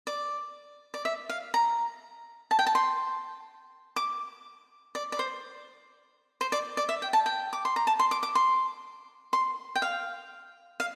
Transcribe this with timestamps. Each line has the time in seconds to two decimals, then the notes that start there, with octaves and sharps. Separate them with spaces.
0.07 D5
0.94 D5
1.05 E5
1.29 F5
1.54 A#5
2.51 A5
2.59 G5
2.67 A5
2.75 C6
3.96 D6
4.95 D5
5.12 D5
5.19 C5
6.41 C5
6.52 D5
6.77 D5
6.89 E5
7.02 G5
7.13 A5
7.26 G5
7.53 D6
7.65 C6
7.76 A#5
7.87 A5
7.99 C6
8.11 D6
8.23 D6
8.35 C6
9.33 C6
9.75 G5
9.82 F5
10.80 F5